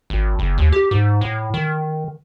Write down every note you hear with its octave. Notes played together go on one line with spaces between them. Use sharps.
G#1
F#1
D#2
G4
G#2
A2
D#3